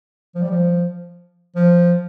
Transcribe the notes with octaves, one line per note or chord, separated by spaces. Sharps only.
F3
G3
F3
F3